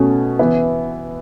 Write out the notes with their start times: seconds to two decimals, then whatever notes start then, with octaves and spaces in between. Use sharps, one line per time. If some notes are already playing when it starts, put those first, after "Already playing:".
Already playing: B2 A3 C#4
0.39 E3 B3 E4